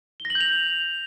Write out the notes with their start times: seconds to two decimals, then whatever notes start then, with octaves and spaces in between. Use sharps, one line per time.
0.20 G7
0.25 A#6
0.30 F#7
0.35 G6
0.41 F7